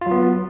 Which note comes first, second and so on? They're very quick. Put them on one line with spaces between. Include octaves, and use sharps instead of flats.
F4 F#3 B3